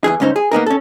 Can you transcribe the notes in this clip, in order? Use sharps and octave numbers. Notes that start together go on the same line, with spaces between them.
E2 E3 G#4
C#2 G2 C#4 D#4 C5
G#4
A#3 B3 D#4 A#4
C#4 A4